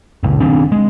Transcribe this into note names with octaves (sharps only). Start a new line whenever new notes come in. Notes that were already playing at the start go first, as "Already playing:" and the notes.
F#1 C#2
F#1 D#3 C4 D4
G#3